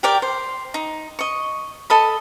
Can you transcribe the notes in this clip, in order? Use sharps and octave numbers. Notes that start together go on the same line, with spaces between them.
G4 A#4 D5 G5
C5
D#4
D#5 C#6
A4 D#5 B5